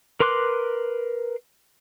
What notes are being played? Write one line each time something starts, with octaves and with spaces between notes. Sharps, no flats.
A#4 B4 C6 D6 F#6